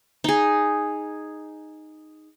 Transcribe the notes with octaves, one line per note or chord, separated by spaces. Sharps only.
D#4 G#4